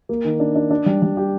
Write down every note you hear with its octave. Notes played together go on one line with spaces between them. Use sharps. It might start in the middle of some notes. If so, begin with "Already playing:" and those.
A#3
D#3
D4
D4
D4
G3
G3
G4